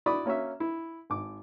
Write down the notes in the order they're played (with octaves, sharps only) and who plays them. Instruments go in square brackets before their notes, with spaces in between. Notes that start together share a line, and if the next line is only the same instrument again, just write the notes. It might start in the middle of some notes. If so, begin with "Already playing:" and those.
[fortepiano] E4 F#4 D5 B5 D6 D#6
A#3 C#4 F#4 E5
E4
G#1 D6